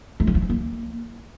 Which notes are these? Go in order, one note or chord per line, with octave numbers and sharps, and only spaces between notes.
A3
E3
F3
E3
A#3